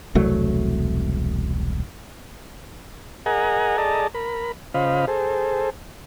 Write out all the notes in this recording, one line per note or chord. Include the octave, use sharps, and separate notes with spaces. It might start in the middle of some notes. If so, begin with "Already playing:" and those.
E1 C2 F#3 A3
G#4 A#4 D#5 F#5 G#5 A#5
G#4 A4 D5 D#5 A5 A#5
A#4 B5
C#3 F4 C5 D#5 F5 B5
G#4 A4 C5